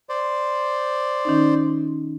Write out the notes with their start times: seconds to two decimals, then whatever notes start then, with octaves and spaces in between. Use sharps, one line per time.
0.09 C5 D5
1.25 D#3 C#4 D#4